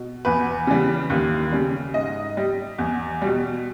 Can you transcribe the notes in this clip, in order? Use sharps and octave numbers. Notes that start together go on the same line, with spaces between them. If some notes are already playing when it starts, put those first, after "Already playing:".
Already playing: B2
E2 B4
C#3 E3 G3
D#2
C#3 G3
G#2 D#5
G3
E2
B2 G3